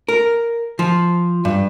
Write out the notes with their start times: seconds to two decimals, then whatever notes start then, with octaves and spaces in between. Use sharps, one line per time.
0.09 A#4
0.79 F3
1.45 G2